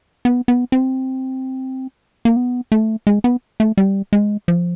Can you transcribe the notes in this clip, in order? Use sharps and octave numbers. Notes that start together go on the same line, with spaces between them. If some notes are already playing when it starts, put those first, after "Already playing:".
B3
B3
C4
A#3
B3
A3
G#3
B3
A3
G3
G#3
F3